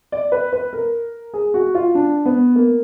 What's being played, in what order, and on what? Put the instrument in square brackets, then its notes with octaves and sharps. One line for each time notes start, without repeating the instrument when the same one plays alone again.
[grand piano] D5
B4
B4
A#4
G#4
F#4
F4
D4
B3
A#3